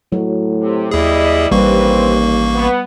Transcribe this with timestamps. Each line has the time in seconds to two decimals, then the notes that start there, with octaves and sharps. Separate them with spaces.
0.12 A2 F#3
0.60 C3
0.92 D#2 G3 E4 G#4 D#5
1.51 A1 D#2 G3 A#3 C4 B4 C#6
2.55 B3